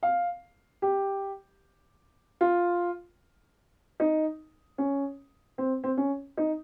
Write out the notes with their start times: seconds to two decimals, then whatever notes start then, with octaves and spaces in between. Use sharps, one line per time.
0.03 F5
0.82 G4
2.41 F4
4.00 D#4
4.78 C#4
5.58 C4
5.84 C4
5.97 C#4
6.37 D#4